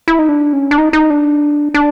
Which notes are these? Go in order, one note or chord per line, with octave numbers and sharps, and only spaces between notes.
E4
D#4
D4
C#4
D4
D#4
D#4
D4
D4